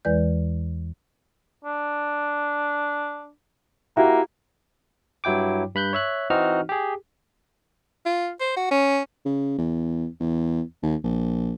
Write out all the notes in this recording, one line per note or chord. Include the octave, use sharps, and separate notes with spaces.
E2 E3 G#3 B4 D5 G6
D4
A#3 E4 F#4 G4
G2 F#3 E4 G5 D6
G2 B5 F#6 G6
C#5 E5 F#6
E3 C4 D#4 F#4 F6
G4 G#4
F4
C5
F#4
C#4
C#3
E2
E2
D#2
A#1